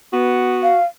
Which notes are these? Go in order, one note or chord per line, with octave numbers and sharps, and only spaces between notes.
B3 F#4
F5